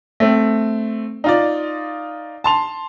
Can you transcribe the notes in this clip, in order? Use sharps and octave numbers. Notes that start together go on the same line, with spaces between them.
A3 C4
D#4 F4 D5
A5 C6 F7